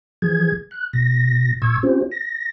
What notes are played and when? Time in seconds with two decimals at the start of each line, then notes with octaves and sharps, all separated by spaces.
0.22 E3 F3 G#4 G#6
0.71 F#6
0.93 B2 A#6
1.62 A#2 C#6 E6 G#6
1.83 C4 C#4 F4 G4 C5
2.11 A#6